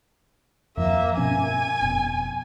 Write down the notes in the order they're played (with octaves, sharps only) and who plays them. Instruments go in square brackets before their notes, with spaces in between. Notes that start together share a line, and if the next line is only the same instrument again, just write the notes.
[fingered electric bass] F2 F3 [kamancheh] A#3 E5
[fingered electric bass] G2 B2 C#4 [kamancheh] G#5
[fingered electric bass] F1 B2